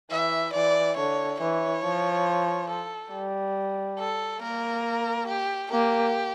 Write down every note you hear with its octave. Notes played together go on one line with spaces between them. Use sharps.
E3 E5
E3 D5
D3 C#5
E3 C#5
F3
A4
G3
A4
A#3 A#4
G4
A#3 G4